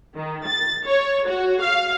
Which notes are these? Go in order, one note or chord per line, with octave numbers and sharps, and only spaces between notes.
D#3
A6
C#5
F#4
F5